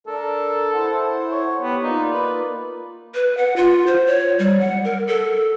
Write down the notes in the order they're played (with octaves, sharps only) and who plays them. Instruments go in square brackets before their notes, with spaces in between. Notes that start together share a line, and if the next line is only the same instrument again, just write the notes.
[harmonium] D4 A#4 [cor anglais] A4
[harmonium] E4 C5 F#5
[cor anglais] C#5
[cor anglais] B3 [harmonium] G4
[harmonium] A#3 F4 D5 [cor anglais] D#4
[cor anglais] B4
[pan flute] B4
F#5
F4
C5
C#5
G3
F#5
A#4
A4